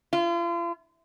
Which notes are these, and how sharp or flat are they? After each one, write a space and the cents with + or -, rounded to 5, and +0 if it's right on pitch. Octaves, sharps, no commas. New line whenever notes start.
F4 -40